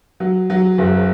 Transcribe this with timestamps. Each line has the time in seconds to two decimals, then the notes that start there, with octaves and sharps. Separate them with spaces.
0.20 F#3
0.50 F#3
0.78 F#1